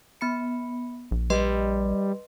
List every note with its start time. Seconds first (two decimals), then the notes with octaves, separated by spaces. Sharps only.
0.21 B3 B5 C#7
1.11 A#1
1.30 G3 B4 D#5 C6